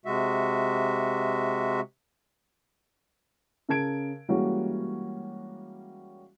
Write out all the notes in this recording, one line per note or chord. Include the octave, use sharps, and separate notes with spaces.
C3 G#3 F#4 E5
C#3 A#4 A5 G#6 D7
E3 G3 G#3 A#3 C#4 F#4